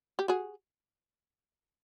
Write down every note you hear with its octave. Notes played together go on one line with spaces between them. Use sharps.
G4
F#4 G#4